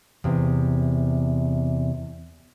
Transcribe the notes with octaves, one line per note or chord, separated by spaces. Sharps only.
E2 C3